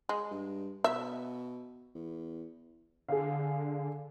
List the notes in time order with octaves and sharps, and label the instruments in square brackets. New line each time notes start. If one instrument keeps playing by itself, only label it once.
[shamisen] G#3
[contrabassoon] G2
[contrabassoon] B2 [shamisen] E5
[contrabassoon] E2
[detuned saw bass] D3 [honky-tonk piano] G#4 F5